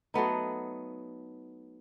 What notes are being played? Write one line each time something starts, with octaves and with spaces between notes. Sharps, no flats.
F#3 A3 B3 D#4